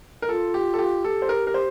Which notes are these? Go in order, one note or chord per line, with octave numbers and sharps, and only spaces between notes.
A#4
F4 A4
G4
A4
G4
G4 A4
C5
A#4
A#4
C5